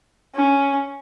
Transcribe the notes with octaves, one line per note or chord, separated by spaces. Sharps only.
C#4